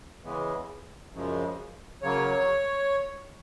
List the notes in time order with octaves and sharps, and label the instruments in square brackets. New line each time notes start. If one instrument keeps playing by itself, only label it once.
[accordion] C#3 E3 G#3 B3
F#2 C#3 F3 G#3
C#3 F#3 A#3 C#5